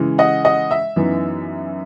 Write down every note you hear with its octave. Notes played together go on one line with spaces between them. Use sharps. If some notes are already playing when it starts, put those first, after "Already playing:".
Already playing: C#3 E3 G#3
D#5 F#5
D#5 F#5
E5
F#2 E3 B3 D#4